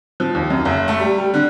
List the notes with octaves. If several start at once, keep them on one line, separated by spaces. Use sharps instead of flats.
F3
D#2
F#2
F#1
A3
G3
G3
D3